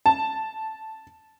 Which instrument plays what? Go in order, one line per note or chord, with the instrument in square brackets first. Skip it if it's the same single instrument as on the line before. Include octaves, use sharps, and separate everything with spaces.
[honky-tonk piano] A5